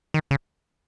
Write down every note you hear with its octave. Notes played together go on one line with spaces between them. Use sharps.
D#3
C#3